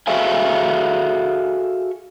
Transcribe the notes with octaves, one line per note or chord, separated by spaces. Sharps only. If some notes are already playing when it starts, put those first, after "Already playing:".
F#4 G#4 A4 E5 F5 G#5